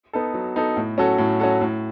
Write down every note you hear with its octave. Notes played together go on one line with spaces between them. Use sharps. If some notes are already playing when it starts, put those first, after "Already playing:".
B3 D#4 A4
F#3
B3 D#4 A4
A2
F#3 C#4 F#4 A4
A2
F#3 C#4 F#4 A4
A2